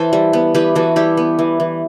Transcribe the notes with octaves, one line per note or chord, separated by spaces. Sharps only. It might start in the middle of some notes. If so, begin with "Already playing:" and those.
Already playing: E3 A4 C5
G3
B3
E3 G4 B4
E3 F#4 A4
G3 E4 G4
B3
E3
E3